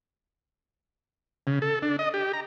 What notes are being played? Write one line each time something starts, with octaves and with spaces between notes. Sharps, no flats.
C#3
A4
D4
D#5
G4
A#5